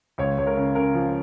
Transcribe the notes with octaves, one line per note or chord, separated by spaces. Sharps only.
C#2 C#5
C#2 C#5
A#4
C#3
C#3 A#4
F3